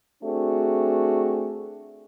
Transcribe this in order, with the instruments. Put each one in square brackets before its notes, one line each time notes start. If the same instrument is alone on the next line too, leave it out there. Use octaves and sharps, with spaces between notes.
[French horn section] A3 C4 D4 F#4 G#4